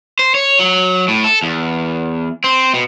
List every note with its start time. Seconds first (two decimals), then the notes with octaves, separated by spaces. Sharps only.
0.19 C5
0.34 C#5
0.59 F#3
1.08 A2
1.24 A4
1.43 E2
2.44 C4
2.74 B2